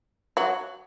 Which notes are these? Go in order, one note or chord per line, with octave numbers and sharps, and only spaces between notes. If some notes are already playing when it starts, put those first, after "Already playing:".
F#3 F#4